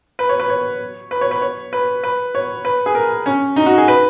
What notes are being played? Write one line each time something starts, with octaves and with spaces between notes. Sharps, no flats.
B4
C#5
B4
C#5
B4
C#5
B4
C#5
B4
B4
C#5
B4
G#4
A#4
C#4
D#4
F#4
G#4
B4